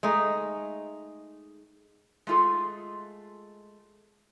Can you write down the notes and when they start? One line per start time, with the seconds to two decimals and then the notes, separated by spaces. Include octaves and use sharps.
0.03 G#3 A3 D#4
2.27 G#3 A3 F4 G#4 A4